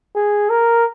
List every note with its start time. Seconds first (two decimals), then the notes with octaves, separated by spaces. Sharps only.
0.15 G#4
0.50 A#4